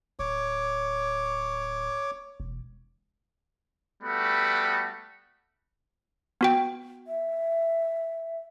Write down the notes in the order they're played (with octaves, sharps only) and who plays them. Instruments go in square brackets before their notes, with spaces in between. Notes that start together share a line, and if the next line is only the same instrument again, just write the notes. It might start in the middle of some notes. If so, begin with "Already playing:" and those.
[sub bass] D1 [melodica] C#5 D6
[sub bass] E1
[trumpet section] G3 A3 B3 F#4 A4 B5
[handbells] B3 F#4 G5
[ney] E5